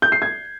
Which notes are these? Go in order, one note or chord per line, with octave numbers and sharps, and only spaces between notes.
G6
C7
G#6